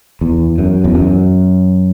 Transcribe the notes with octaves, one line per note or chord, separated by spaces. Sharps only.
E2
F#2
E2
F#2